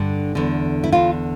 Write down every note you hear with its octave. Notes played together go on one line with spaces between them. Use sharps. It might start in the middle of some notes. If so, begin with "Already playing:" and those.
Already playing: G2 D3
E2 D3
E4
E2 D3 F4